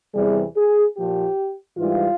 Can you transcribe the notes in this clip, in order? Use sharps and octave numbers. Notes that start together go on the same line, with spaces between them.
E2 C3 E3 G3 G#4
G#4
A#2 F3 G4
G#2 E3 G3 F4